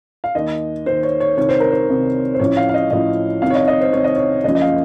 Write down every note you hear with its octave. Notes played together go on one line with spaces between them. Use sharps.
F5
D#2 D#3 D#5
D#2 D#3 C5
C#5
C#5
C2 C3 D#3 C#5
C5
A#4
C5
C2 C3 D#3
C5
A1 A2 F3 C#5
F5
F5
D#5
A1 A2 F3 D#5
C2 C3 D#3 F5
C#5
D#5
D#5
C5
C2 C3 D#3 C#5
D#5
C#5
F#1 F#2 F3 D#5
D#5
F5